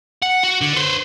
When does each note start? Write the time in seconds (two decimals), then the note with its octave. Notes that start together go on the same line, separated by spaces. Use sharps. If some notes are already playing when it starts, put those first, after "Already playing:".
0.22 F#5
0.43 F#4
0.61 D3
0.73 B4 C5